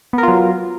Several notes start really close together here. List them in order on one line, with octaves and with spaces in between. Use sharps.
B3 A#4 F4 F#3